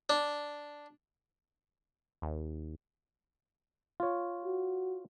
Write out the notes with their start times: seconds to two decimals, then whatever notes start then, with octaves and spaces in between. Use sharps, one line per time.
0.10 D4
2.22 D#2
4.00 F4 C#5
4.45 F#4